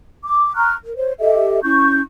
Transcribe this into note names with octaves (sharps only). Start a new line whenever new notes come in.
D6
A#5 C#6 F6 F#6
A#4
C5 C#5
G4 A4 D#5 E5
C#4 E4 C#6 G6